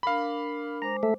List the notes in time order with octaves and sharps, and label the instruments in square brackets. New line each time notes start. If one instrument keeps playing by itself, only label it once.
[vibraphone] D4 A#4 D6 [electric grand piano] F5 B5
[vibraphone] G#3 C5 D6 [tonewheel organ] A#5
[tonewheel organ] A3 A4 E5